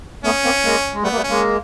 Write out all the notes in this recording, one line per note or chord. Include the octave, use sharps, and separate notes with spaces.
A3 B3 C#4
A#3 C4
G#3 A#3
G#3
G3 A3 B3
A#3
G3 A3
C#4
G#3 A#3